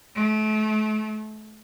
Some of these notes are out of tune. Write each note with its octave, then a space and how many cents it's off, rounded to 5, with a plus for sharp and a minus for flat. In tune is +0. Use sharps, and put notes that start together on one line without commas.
A3 -35